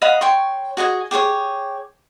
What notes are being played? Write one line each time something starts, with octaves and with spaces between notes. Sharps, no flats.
D#5 F5 F#5 B5
C#5 G5 C6 C#6
F#4 G#4 D#5 G#5
G4 G#4 B4 C#5